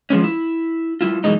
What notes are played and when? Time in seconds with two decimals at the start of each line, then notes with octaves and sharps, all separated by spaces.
0.10 F3 G#3 B3 C#4
0.24 E4
1.01 G3 E4 F4
1.24 F#2 B2 E3 G#3 D#4